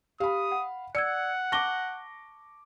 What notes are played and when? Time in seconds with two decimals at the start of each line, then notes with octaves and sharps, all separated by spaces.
0.20 G4 F5 B5 D#6
0.52 F#5
0.95 D5 F#5 E6 G#6 C#7
1.52 A5 C#6 D6 A#6 G7